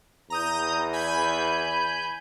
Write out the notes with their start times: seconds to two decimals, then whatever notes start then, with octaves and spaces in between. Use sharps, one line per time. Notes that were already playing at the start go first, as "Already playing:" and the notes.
0.30 E2 A#5 D#6 G6
0.93 G#5 B5 G6